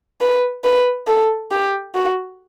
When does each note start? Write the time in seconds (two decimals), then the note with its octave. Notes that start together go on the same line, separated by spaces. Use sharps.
0.21 B4
0.64 B4
1.07 A4
1.51 G4
1.95 F#4